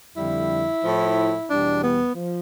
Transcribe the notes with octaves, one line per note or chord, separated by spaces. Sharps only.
F2 D3 G3 E4
A2 F3
E2 B2 G3 D4
B3
F3